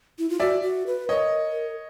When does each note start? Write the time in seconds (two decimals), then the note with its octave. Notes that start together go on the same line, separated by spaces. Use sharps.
0.19 E4
0.30 F4
0.40 F#4 D5 E5
0.62 F#4
0.87 B4
1.09 A#4 C#5 D#5